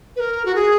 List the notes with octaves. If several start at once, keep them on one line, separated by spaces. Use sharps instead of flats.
B4
A#4
F#4
G#4